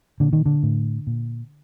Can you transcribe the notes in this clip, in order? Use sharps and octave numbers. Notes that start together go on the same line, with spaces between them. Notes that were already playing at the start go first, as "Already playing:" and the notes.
A#2 D3
D#3
D3
A2
A#2